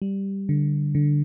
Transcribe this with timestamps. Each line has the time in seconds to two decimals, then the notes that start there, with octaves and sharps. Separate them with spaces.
0.02 G3
0.49 D3
0.95 D3